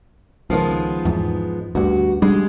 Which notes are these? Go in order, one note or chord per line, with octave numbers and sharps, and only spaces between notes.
C#2 D#3 F3 G#3 B3
E2 G#2
D2 G2 F#4
G3 G#3 D4